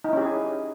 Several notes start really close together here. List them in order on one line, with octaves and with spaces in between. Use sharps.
D#4 E4 C#4 G4 G#4